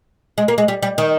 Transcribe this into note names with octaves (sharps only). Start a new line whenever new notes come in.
G#3
A#3
G#3
G3
G3
D#3